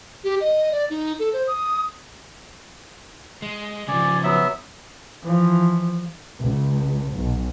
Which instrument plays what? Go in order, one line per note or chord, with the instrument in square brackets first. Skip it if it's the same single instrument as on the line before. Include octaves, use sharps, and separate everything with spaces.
[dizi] G4
D#5
D5
D#4
A4
C5
D#6
[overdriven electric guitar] G#3
[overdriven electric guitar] C#3 F3 [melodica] D5 G#5
[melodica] F#3 B3 E5
[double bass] E3 F3
[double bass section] C#2
B1